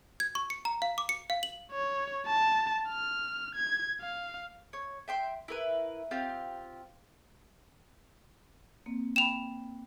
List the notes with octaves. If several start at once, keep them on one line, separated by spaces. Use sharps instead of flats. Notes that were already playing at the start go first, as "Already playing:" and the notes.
G#6
C#6
C#7
A#5
F5
D6
C#7
F5
F#7
C#5
A5
F6
G#6
F5
C#5
E5 G5 C6
E4 A#4 B4
C4 F4 G4 F5
A#3 C4
G5 B5 E7 F7